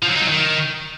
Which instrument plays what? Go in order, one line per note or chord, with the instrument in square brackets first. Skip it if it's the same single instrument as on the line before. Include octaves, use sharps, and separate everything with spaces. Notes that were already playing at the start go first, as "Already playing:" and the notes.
[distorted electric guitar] F3
F#3
D#4
F#3
D#3